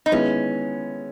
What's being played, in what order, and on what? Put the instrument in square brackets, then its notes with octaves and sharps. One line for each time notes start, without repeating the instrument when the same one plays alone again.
[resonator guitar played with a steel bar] D#4
[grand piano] D#3 G#3 B3 E4 [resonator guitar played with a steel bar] C#4